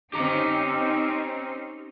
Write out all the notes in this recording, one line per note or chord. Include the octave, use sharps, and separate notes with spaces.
C4 C#4 D#4 G4 A#5